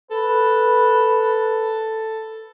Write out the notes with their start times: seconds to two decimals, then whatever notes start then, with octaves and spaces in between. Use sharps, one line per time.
0.11 A4 B4